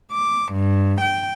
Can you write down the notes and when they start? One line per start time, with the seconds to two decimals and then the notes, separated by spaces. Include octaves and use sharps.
0.12 D6
0.52 G2
1.01 G5